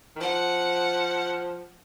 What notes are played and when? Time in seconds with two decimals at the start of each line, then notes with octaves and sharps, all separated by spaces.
0.16 D#3
0.20 F3 F#5